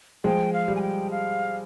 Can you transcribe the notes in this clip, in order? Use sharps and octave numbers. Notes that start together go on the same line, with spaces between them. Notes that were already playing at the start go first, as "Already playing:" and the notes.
F3 G#3 G5
F5
G3
G#5
G5
F5